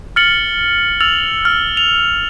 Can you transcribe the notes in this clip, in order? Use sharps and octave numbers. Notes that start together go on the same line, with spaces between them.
F6 A6 C#7 F#7
E6 F6 A6 F7 F#7
F6
F7